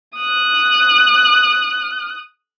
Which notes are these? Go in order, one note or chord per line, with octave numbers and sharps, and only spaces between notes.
D#6 F#6